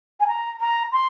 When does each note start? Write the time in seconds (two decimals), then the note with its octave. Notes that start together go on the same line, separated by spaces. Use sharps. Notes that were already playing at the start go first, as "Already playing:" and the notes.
0.20 G#5
0.27 A#5
0.60 A#5
0.92 C6